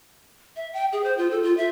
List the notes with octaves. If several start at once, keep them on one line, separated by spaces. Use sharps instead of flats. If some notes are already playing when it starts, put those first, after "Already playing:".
E5
G5
G#4
C5
F4
A4
F4
E5